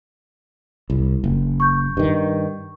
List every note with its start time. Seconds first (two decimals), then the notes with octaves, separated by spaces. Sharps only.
0.90 C2
1.24 F#1
1.60 C#6 G6
1.97 G2 D#3